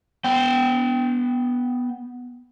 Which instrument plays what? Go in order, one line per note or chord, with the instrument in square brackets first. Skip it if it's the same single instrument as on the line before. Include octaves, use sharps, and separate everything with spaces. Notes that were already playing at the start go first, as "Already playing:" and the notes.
[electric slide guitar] B3 G5